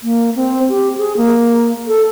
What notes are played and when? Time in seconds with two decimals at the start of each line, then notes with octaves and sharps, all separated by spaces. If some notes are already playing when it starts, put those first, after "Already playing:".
0.03 A#3
0.36 C4
0.69 G4
0.98 G#4
1.17 A#3
1.88 A4